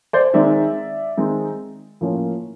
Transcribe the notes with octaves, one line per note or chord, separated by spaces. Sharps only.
C5 D5
D#3 G#3 C4 D#4 D5 E5
D#3 G#3 C4 D#4
A2 F3 A#3 C#4